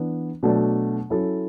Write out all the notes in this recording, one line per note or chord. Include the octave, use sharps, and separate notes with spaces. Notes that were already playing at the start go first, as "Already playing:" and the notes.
Already playing: E3 B3 D4
B2 F#3 A3 D4 A4
F#3 C#4 E4 A4